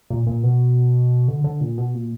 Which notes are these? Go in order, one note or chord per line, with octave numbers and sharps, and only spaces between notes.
A#2
A#2
B2
D3
D3
A#2
B2
A#2